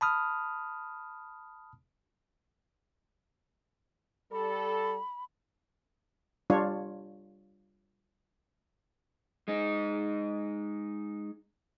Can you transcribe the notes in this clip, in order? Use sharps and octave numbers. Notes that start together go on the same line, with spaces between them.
A5 B5 D#6 F6
G3 A4 B5
G3 D4 F4 C#5
G#3 D#4